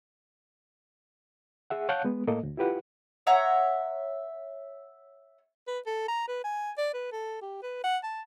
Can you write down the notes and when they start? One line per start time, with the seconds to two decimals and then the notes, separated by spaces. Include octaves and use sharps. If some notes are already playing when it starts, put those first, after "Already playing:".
1.70 G#4 E5 F#5
1.89 C#5 F5 F#5 A5 F#6 G6
2.04 G#3 B3
2.27 A2 A#3 A4 D#5
2.43 D2
2.57 E4 F4 G4 B4 F#5
3.27 C#5 E5 F#5 A#5
5.67 B4
5.86 A4
6.08 A#5
6.28 B4
6.44 G#5
6.77 D5
6.94 B4
7.12 A4
7.42 G4
7.63 B4
7.84 F#5
8.03 A5